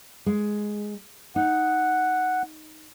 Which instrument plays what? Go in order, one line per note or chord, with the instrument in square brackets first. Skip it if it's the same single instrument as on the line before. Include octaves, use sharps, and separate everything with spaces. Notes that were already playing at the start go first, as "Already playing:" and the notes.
[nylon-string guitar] G#3
[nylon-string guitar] D#4 [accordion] F#5